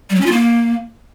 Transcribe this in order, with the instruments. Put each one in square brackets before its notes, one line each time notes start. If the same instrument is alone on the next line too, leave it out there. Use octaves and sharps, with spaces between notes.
[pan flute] G3
F#3
C#4
F4
A#3